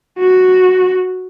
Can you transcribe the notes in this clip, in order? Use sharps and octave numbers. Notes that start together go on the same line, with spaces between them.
F#4